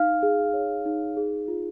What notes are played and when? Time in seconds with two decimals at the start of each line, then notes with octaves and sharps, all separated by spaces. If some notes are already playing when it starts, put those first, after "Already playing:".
Already playing: D#4 F5 F6
0.23 G#4
0.54 C#5
0.85 D#4
1.17 G#4
1.48 F4